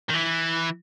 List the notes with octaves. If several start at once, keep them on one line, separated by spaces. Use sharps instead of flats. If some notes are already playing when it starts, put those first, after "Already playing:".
D#3
E3